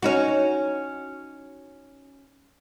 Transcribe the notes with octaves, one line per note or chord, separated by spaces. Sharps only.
C#4 D#4 F#4